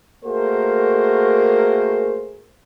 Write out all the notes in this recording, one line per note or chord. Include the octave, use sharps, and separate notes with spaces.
A3 A#3 F#4 G#4 A#4 C5